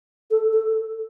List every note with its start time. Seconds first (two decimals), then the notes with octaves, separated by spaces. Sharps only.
0.31 A4
0.53 A4